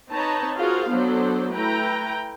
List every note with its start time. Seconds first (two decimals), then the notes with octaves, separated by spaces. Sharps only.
0.11 C4 D#4 B4 C#5 A5 A#5
0.58 F4 F#4 G#4 A#4 C5 F5
0.90 F#3 B3 D4 A4 C5
1.54 A3 E4 B4 G5 A#5